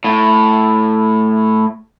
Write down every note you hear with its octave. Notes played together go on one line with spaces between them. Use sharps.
A2